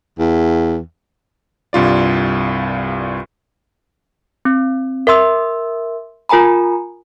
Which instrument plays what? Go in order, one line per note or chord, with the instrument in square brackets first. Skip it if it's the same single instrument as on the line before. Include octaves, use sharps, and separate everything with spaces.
[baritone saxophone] E2
[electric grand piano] C2 G2 F4 D5
[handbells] C4
A#4 E5 C6 E6
F4 A#4 G#5 A#5 B5